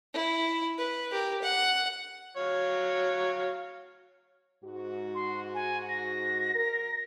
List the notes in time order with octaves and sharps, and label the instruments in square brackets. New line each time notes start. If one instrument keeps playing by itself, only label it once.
[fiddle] E4
B4
G4 A#4
F#5
[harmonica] F#3 C#5 F5
[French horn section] G#2 F#4
[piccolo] C6
G#5
A#6
[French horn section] A#4